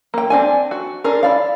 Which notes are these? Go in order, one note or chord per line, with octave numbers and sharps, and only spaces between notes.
A#3 G5
C4 D4 G#5
F#4
D4 G#4 A#4
E4 D5 F5